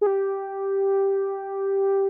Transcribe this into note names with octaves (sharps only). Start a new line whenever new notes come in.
G#4
G4